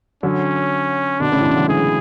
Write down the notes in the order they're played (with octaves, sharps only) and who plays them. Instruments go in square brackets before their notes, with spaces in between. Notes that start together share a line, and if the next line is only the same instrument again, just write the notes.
[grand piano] D3 F#3 [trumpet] C#4
[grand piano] B2 D3 [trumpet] D4
[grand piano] A2 C#3
E3
B2 D3
D3 F#3
[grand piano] E3 G#3 [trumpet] G#4